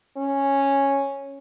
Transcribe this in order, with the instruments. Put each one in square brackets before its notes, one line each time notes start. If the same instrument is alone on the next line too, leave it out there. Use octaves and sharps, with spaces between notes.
[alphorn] C#4